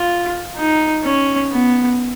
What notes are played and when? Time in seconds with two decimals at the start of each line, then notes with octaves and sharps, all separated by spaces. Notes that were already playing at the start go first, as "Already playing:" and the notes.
Already playing: F4
0.56 D#4
1.04 C#4
1.52 B3